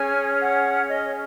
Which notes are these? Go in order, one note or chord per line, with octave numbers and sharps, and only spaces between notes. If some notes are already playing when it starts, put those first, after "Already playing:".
Already playing: C#4 G#4 C#5 G#5
F#5
D#5